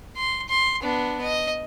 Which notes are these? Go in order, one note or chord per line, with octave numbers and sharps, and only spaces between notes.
C6
C6
B3 D4
D#5